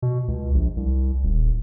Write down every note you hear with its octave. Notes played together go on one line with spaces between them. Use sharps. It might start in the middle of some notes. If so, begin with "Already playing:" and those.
B2
C#2
A#1
C2
D#1